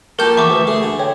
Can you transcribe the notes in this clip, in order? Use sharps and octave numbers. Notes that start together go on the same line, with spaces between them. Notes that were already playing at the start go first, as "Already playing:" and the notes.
A#3 F4 G4 A4 A#4 A5 C#6 G6
E2 E5 B5 C#6 D6
D2 D4 B4 D#6
A3 G#4
D3
G4 C#5 G5